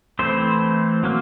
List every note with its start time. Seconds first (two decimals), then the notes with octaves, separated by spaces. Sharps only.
0.19 E3 A3 C4 E4 C5
1.04 F#3 A#3